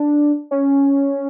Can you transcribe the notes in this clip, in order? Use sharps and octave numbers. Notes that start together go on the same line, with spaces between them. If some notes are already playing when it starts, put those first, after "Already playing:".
Already playing: D4
C#4